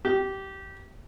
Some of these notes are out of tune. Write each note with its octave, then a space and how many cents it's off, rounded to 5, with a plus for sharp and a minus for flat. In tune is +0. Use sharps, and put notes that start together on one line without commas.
G4 -20